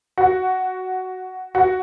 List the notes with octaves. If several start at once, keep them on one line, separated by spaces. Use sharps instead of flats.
F#4
F#4